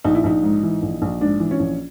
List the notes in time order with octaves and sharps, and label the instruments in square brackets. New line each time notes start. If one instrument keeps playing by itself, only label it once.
[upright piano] A#1 D#4
E4
A#1 D#4
G#2
E3
A#1
A#1
G#2 D4
E3
C#4
A#1